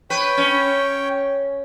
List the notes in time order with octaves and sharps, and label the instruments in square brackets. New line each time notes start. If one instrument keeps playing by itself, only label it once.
[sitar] B4 [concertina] C#5 G5
[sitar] C#4